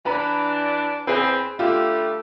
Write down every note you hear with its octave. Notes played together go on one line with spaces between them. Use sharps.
E3 D4 B4 A#5
E2 C4 G#4 B4
D3 G3 A3 F4 G4